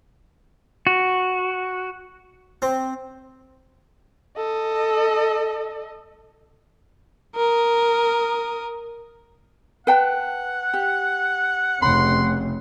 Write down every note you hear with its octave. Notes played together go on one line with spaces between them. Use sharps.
F#4
C4
A4 D#5
A#4 D#6
B4 F#5 G5 A5
G4
F1 C#3 B5 C6